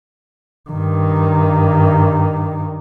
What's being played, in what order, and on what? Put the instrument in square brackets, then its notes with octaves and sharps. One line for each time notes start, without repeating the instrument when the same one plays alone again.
[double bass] G2 D#3